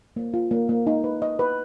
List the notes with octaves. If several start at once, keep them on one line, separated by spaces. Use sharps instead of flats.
A#3
F4
A#3
A#3
D#4
B4
D#5
B4